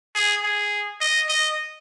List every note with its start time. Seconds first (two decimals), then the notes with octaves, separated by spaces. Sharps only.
0.15 G#4
0.43 G#4
1.01 D#5
1.29 D#5